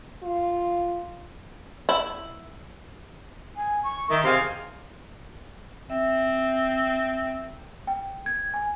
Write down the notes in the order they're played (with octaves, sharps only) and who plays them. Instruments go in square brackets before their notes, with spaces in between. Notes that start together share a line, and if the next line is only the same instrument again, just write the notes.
[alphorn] F4
[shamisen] E4
[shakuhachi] G#5
C#6
[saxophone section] D#3 [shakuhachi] E5
[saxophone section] C3 G#4 F5 [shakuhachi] C6
[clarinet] C4 [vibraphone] E5
[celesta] G5
G#6
G#5